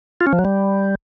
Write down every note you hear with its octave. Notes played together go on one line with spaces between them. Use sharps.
F4
C#4
F3
F#3
G3